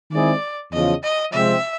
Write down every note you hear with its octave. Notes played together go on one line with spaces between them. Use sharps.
D#3 G#3 C4 E4 G#4 D5
E2 C#3 F3 D#5
D#5
C3 F3 G#3 C4 E5